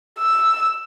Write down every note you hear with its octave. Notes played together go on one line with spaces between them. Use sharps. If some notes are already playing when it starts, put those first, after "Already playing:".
E6